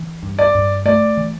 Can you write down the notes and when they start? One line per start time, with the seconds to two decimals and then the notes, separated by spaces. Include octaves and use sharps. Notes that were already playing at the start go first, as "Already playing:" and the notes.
Already playing: E3
0.23 G2
0.39 D5
0.55 G2
0.86 A3 D5
1.17 E3